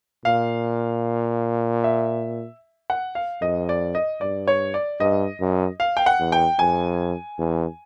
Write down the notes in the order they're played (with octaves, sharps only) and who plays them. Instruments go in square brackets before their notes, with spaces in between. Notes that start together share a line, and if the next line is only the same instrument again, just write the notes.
[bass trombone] A#2 [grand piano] F5
[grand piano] E5
F#5
F5
[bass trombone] F2 [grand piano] D#5
[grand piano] D5
D#5
[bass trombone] G2 [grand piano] D5
[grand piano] C#5
D5
[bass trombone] G2 [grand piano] D#5
[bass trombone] F#2
[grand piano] F5
G5
F#5
[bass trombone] E2
[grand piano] G5
[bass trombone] F2 [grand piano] G#5
[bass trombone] E2